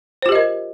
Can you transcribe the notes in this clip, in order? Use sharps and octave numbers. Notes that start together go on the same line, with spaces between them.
F4 G4 A#4 C5 D#5